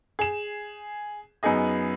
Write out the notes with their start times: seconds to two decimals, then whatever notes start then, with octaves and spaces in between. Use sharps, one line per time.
0.19 G#4 E7
1.43 F#2 B3 D#4 G#4 D#5